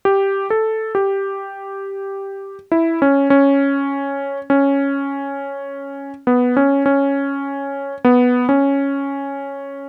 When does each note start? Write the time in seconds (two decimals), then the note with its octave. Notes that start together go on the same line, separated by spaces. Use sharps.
0.05 G4
0.50 A4
0.95 G4
2.72 E4
3.02 C#4
3.30 C#4
4.50 C#4
6.27 B3
6.57 C#4
6.86 C#4
8.05 B3
8.49 C#4